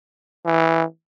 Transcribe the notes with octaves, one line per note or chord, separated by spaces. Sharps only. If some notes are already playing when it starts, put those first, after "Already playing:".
E3